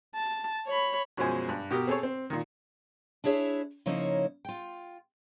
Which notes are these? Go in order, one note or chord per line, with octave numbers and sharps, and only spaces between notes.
A5
C#5 B5
F#2 B2 F3 G#3 C5 G#5
G2
B2 G4 A#4 D#6
C4 G#4 A4 C#5
C4
A#2 D#3
D4 E4 G#4 C#5 E5
C#3 F3 A#3 D#4 E4 C#5
F4 G5